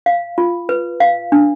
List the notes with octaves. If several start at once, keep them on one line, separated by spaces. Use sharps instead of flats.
F5
F4
B4
F5
D4